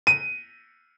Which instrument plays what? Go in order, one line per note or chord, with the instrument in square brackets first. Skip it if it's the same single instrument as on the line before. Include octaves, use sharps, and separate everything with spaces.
[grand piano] D#7